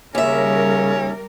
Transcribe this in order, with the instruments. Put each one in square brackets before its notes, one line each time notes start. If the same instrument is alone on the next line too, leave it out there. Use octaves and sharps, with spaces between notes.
[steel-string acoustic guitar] D#2 E5 [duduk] C#3 [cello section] G3 A#4 [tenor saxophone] C#4